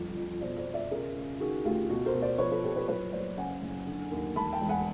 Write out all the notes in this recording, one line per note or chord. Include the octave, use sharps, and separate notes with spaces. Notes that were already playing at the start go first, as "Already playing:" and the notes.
Already playing: G1 F2
F2
B2 C5 D5
C5 D5
B2
D5 E5
C#3 G#4 A#4
C#3
D#3 F#4 G#4
D2 F4 G4
B2 F#4
A#4 C5
B2
C5 D5
F3 B4 C#5
A4 B4
A#2 G4 A4
A4 B4
F#1 B4 C#5
F#1 C5 D5
C#3 F#5 G#5
F#1
D3
D#2
E1 A5 B5
G5 A5
E1
F#5 G#5